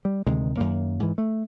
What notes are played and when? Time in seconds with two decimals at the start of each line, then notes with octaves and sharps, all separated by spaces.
0.05 G3
0.26 D2 C3 D#3 G#3
0.57 F#2 D#3 A#3
1.00 G#2 E3
1.18 A3